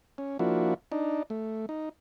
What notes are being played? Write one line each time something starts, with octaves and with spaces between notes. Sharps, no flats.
C#4
F3 A#3 D4 E4 F#4
D4 D#4
A3
D#4